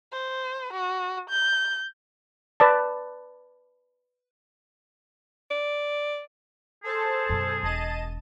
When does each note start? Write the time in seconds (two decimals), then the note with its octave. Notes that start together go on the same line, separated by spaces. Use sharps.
0.12 C5
0.73 F#4
1.30 G6
2.60 B4 D5 A5
5.51 D5
6.84 G#4 A4 C5 A5
7.29 F#2 B2
7.63 E1 D#5 A5 D#7